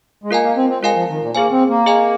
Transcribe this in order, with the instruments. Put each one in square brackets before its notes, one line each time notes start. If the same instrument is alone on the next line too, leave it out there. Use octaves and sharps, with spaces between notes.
[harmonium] G#3
[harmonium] A#3 [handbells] F4 A#4 D#5 G#5
[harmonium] A#3
C4
C4
[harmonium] G#3 [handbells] F4 A#4 F5 G#5
[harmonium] F3
D#3
A#2
[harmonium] A#3 [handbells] G#4 C5 G#5
[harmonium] C4
A#3
[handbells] G#4 D#5 G#5